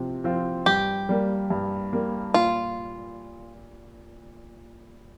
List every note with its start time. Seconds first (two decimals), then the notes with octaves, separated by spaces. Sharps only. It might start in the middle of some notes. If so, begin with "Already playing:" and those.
Already playing: C3 F3 C4
0.24 F3 C4 F4
0.66 G2 G4
1.09 G3 A#3
1.50 G2
1.93 G3 A#3
2.34 A#2 F4